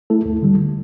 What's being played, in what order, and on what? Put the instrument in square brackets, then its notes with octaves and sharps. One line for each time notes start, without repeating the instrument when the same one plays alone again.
[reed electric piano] A3 E4 A4
D2
D3 G3